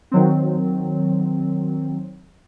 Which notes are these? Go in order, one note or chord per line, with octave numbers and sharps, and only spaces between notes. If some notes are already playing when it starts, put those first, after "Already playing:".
D#3 F#3 C4